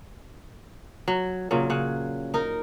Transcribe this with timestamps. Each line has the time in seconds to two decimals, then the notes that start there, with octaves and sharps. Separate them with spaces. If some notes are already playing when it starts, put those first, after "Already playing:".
1.08 F#3
1.51 A#2 C#3 F#3
1.70 C#3 F#5
2.34 D#4 A#4